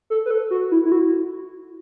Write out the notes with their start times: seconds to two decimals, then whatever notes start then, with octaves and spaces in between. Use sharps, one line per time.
0.10 A4
0.26 B4
0.31 A4
0.50 F#4
0.71 E4
0.85 E4
0.92 F#4